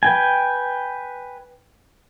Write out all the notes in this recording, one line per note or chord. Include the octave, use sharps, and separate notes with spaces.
B4 G5 G#5